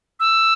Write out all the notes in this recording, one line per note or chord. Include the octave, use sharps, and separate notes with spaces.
E6